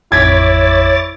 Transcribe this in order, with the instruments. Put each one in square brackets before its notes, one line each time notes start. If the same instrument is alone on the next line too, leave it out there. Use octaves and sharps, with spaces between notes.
[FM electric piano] A1 F2 B6 [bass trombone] E4 [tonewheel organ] C#5 D6 A6 [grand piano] G#6